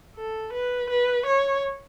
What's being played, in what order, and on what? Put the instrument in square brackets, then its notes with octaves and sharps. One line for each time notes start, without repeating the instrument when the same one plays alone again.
[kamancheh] A4
B4
B4
C#5